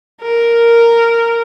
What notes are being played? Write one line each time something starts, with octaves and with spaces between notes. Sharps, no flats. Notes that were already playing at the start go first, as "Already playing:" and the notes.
A#4